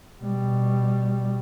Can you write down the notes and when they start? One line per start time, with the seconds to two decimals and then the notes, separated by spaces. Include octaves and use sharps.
0.22 B2 G3